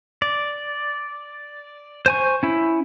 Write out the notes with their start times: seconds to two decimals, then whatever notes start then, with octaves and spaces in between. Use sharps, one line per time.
0.22 D5
2.06 C5 G#5 C#6
2.43 C#4 E4